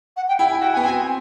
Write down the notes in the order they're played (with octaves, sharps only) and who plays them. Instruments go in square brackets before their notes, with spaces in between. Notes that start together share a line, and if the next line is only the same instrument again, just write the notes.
[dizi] F#5
G5
[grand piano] E4 [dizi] G5
[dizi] G#5
[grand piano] F#4 [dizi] G5
[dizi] G#5
[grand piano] B3
[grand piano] C4 [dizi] G#5